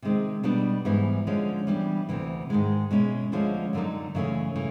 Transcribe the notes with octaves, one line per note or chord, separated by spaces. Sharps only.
C3 D#3 G#3 C4
B2 G3 B3 D4 F#4
G#2 E3 G3 B3 E4
D3 F3 G#3 C#4
E3 G3 B3 D4
D2 C3 E3
G#2 D#3 G#3
B2 G#3 C#4 E4
D2 D3 F3 G#3 C#4
F#2 D3 F#3 A#3 D#4
F#2 C#3 E3 A3 C#4
C#3 E3 A3